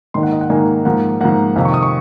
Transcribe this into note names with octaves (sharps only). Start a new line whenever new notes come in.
G#2 D#3 A#3 D#4 C6
F#5
D#5
F#5
G#2 D#3 A#3 D#4 G#5
G#2 F3 A#3 F#5
G#2 F3 A#3 F#5
F2 C3 D#3 F5
C#6
D#6
C#6